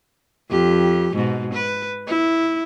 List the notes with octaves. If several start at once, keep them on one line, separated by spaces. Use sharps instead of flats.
F2 G4
G#2 B2
B4
E4